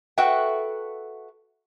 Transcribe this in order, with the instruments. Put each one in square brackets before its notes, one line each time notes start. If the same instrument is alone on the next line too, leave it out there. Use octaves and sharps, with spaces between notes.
[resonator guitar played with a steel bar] F#4 A4 B4 E5 F#5 G5